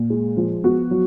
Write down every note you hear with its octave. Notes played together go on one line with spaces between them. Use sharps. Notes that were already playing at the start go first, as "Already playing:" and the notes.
Already playing: A#2
G#3
F3
B3 F#4
F#3